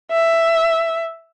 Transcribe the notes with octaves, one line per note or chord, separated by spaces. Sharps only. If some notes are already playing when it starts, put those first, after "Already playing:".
E5